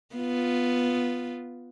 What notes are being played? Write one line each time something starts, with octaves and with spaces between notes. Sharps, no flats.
B3 F4